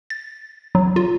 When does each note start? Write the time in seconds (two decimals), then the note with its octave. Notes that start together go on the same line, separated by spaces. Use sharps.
0.10 A6
0.75 F#3
0.96 F4